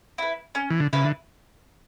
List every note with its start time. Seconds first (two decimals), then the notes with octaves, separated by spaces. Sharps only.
0.18 E4 B4
0.55 C#4
0.70 E3
0.80 D3
0.93 C#3 E4 B4
1.05 D3